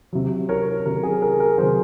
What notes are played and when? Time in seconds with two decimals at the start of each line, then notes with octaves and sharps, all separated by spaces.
0.13 C3 F#3
0.49 A#4 C#5
0.86 C3 F#3 A#4
1.03 G#4
1.22 A#4
1.40 A#4
1.58 C3 F#3 G#4 C5